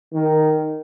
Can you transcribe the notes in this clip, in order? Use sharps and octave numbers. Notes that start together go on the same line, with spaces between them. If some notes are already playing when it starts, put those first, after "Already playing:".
D#3